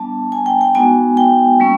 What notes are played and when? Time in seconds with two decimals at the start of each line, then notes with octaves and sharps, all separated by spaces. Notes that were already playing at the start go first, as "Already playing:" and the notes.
Already playing: G3 B3 D4 A5
0.32 G#5
0.46 G5
0.61 G5
0.75 G#3 B3 D#4 F#4 G#5
1.17 G5
1.60 G3 A#3 C#4